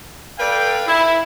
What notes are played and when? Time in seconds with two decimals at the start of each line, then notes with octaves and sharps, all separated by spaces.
0.39 A4 B4 D5 F5 G5
0.87 E4